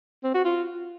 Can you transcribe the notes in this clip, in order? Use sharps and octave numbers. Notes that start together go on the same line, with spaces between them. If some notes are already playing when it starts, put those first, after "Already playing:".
C4
F#4
F4